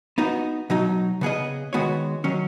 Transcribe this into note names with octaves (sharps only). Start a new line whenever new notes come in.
B3 D#4 F#4
B2 F#3 D#4
C#3 B3 G#4 D#5
D#3 G#3 B3 F#4 C#5
D#3 F#3 C#4